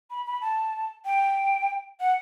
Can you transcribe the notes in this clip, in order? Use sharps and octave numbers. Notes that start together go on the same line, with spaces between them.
B5
B5
A5
G5
F#5